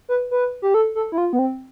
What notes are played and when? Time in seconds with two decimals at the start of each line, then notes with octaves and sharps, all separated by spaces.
0.09 B4
0.31 B4
0.62 G4
0.74 A4
0.95 A4
1.12 E4
1.18 F4
1.33 B3
1.39 C4